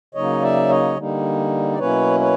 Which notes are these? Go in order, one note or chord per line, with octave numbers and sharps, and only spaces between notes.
C#3 F#3 A#3 D#4 C#5 D#5
D5 E5
C#5 D#5
D3 G3 A#3 D#4
D5
B2 F#3 A#3 C#4 E4 B4 C#5
B4 C#5